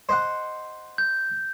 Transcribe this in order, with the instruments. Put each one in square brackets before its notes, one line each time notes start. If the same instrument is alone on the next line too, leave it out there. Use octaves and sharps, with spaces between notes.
[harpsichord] C5 D#5 F#5
[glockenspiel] G6